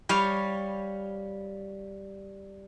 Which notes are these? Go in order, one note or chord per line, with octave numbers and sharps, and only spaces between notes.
G3 C#5 F5